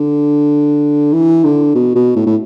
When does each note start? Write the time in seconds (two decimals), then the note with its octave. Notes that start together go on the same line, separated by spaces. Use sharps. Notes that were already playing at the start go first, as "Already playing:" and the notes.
Already playing: D3
1.13 E3
1.44 D3
1.75 B2
1.95 B2
2.16 A2
2.26 A2